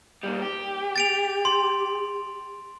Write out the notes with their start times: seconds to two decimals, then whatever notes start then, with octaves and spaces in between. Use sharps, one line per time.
0.23 A#2 G3
0.42 G4
0.96 A6 D7 F7
1.45 C6